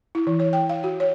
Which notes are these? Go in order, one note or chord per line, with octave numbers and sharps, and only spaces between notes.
E4
E3
C#5
G5
F5
F#4
C#5